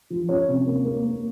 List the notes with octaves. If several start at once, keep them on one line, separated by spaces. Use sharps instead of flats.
F3
C#4 C#5
C3
A#3
A#3
A#3